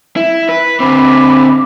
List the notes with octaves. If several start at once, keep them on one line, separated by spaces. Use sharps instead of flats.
E4
B4
D3 C4 B5 D6